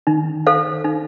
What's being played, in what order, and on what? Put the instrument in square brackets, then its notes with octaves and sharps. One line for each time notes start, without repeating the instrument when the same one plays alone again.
[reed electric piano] D#3 [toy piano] D#4
[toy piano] A4 C5 F5
D#4